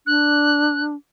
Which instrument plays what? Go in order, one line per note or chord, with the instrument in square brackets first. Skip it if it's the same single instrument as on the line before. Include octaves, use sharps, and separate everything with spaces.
[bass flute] D4 [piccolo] F#6